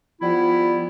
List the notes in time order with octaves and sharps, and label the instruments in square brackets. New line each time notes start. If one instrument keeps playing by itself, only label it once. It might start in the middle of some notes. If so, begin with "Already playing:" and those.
[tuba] F3 [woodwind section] G3 B3 E4